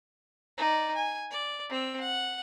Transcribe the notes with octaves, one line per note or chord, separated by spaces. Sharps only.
D#4 D5
G#5
D5
C4 E6
F#5